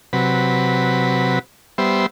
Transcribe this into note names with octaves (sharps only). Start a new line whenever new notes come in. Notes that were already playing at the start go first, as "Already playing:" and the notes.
C3 F#3 B4
G3 B3 C5 E5